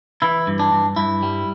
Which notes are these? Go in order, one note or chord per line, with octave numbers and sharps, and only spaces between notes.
E3 E4
G2
D4
G2
G2 E4
G3